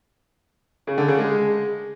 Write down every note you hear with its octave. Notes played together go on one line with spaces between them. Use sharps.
C#3
D3
C#3
G#3